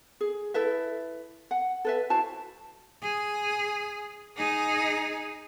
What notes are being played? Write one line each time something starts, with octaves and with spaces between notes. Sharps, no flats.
G#4
E4 A4 B4 E5
F#5
A4 B4 E5
E4 F#4 C5 A5
G#4
D#4 G#4